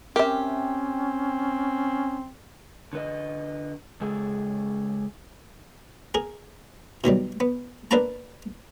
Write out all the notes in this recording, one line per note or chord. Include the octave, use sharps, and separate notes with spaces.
C4 C#4 G4 A#4 E5
D3 B4 D#5
C#3 G#3 G#4 A4
G#4 A#4
B2 D#3 F#3 G3
B3
A#3 D4 B4 F5 A5 A#5